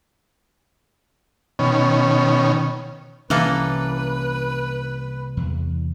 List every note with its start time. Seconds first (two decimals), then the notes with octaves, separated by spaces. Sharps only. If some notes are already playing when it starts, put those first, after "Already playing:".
1.59 B2 D#3 C#4
3.30 C2 E3 A#3 C#4 A4 B4
5.37 E2